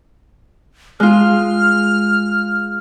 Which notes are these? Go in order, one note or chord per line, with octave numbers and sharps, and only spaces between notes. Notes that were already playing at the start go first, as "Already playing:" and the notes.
G#3 F4 F6